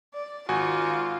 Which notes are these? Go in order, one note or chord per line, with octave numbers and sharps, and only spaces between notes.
D5
G#1 F4 F#4 G#5